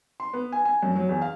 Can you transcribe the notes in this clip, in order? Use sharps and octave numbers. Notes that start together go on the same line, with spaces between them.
C6
B3
G#5
G#5
F#2
F#3
E2
F5